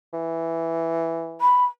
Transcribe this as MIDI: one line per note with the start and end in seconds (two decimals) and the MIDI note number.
0.13 1.49 52
1.41 1.65 83